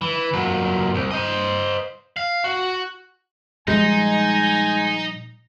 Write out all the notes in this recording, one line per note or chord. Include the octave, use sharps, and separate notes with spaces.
E3
A#2 F#3
C2
C5 D#5
F5
F#4
A#2 F3 G3 G#3 D#4 G#5